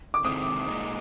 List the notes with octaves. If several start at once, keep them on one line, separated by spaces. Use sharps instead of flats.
D6
C3 D#3 G#3 C4 D#6
A#2 G#3 D#4